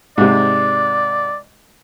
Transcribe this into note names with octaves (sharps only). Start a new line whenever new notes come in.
G#2 C3 D5